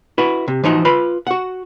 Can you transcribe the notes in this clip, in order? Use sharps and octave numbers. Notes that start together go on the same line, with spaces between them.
E4 F#4 B4
C3
E3 F3 D#4 F#4
F4 B4 B5
F#4 F#5